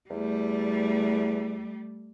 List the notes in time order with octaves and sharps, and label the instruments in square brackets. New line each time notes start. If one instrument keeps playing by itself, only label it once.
[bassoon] E2 [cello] G3 A3